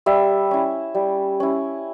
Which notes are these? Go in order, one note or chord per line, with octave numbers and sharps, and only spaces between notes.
G3 E5
C#4 E4
G3
C#4 E4